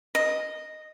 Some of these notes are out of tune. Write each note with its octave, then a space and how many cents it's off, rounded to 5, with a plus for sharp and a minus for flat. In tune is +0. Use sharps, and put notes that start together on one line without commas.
D#5 -5